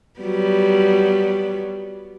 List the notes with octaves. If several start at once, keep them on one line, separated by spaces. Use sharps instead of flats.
F#3 G3 B3